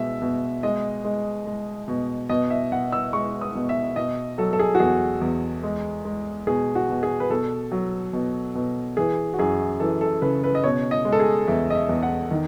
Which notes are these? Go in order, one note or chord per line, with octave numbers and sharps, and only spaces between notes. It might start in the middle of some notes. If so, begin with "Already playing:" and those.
Already playing: B2 G#3 E5
B2
G#3 D#5
G#3
G#3
B2
B2 D#5
E5
B2 F#5
E6
G#3 C#6
D#6
B2
E5
B2 D#5
F#3 A4
A4
G#4
F#4
E2 G#4
E2
G#3
G#3
B2 G#4
F#4
B2
G#4
B4
B2 A4
F#3
B2
B2
E3 G#4
F#4
F#2 G#4
E3 A4
A4
C#3 B4
B4
D#5
B2 C#5
D#5
G#3
A4
G#4
E2 E5
D#5
E5
E2
F#5
D#3